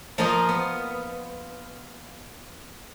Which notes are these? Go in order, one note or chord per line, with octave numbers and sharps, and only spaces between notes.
F3 A#3 F4 A#4 C5 D#5
B3